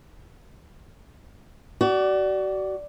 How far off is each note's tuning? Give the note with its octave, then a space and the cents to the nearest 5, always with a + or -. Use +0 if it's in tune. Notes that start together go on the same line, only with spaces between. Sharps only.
F#4 +35 D5 +0